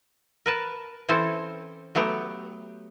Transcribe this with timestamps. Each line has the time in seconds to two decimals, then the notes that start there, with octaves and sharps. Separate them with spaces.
0.46 A#4 B4 A5
1.09 E3 C4 C#4 E4 A4 C5
1.95 F#3 A3 B3 G4